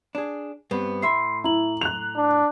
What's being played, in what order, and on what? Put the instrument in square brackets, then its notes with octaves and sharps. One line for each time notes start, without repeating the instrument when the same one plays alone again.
[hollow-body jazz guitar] D4 G#4
G2 B3 C4
[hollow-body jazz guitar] A2 E5 [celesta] B5 C6 C7
[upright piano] E4 [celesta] A#5 F#7
[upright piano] F#6 F7
[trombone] D4